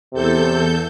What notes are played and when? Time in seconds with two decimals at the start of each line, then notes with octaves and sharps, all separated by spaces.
0.13 E2 C3 A4 G6